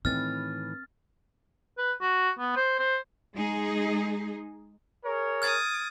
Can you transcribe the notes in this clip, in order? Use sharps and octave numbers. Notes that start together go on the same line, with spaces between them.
A2 D#3 E3 C4 F6 A6
B4
F#4
B3
C5
C5
G#3 D#4 G#4
G#4 A#4 C#5
D6 D#6 F6 G#6 A6